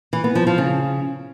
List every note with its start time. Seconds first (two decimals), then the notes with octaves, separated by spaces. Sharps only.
0.13 E3
0.24 B3
0.35 F3
0.47 F3
0.58 C#3